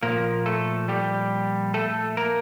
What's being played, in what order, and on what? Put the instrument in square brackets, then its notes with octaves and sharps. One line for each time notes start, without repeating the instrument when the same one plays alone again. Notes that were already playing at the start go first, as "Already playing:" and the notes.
[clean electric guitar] A#2 F3 A#3 A#4
A3 A4
G3 G4
A3 A4
A#3 A#4